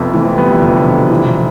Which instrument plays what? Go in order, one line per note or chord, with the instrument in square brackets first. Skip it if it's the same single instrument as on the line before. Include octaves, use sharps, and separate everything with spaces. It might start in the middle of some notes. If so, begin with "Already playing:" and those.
Already playing: [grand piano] F1 F2 B3
[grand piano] E3 [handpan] A3 C4
[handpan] A3
[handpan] G3 [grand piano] B3
[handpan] F3
[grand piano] F1 [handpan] D3
[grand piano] F2 [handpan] B2
[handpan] C3 [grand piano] E3
[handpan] B2